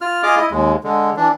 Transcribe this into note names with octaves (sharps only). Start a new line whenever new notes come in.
F4 F6
F4 G#4 D#5 D6 F6
E4 D#5
D#2 G#3
D3 G#3
E3 D4